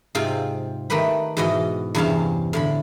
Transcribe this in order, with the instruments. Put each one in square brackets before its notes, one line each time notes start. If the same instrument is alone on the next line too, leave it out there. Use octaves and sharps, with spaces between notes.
[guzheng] G#2 C3 C4 F4 F5 G5
D#3 A3 G4 B4 B5
G#2 B2 E3 F#4 D#5
E2 G2 C3 C#4 F5 A5
A2 D3 B5